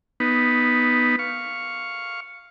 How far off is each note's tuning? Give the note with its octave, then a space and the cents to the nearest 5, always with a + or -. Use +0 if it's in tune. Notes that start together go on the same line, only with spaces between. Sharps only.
B3 +0 D#4 +0
F5 +0 C#6 +0